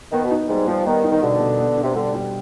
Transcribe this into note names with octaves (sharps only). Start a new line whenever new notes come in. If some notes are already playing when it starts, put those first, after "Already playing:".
D#3 B3
B2
D#4
G#2 G3
F3 G3
D#3 B3
D#4
D#3
B2 D3
B2
B3
D4
C3
D3 G3
G3